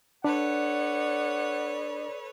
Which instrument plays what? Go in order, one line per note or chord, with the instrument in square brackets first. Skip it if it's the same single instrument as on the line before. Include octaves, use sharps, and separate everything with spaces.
[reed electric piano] D4 [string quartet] A4 B4 C#5 [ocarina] D5 [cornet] F#5